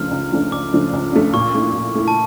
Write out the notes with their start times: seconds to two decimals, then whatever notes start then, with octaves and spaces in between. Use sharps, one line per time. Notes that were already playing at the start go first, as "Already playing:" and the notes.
Already playing: C#2 C#3 F3 A3 D4 F6
0.11 C#2
0.32 C#3 F3 A3 D4
0.52 C#2 D6
0.73 C#3 F3 A3 D4
0.93 C#2
1.13 C#3 F3 A3 D4
1.33 A#2 C#6
1.55 A3 E4
1.74 A#2
1.95 A3 E4
2.08 A5